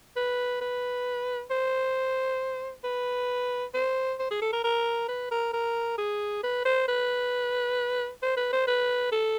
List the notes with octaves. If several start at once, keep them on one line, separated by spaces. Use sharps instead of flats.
B4
B4
C5
B4
C5
C5
G#4
A4
A#4
A#4
B4
A#4
A#4
G#4
B4
C5
B4
C5
B4
C5
B4
A4